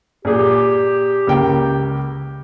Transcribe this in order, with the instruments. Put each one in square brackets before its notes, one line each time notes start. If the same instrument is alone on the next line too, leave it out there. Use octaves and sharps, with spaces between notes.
[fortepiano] A#2 G#4 [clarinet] G4
[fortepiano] C#2 A#3 G5